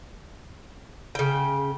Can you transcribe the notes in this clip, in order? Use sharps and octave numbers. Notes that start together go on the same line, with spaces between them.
C#3 G5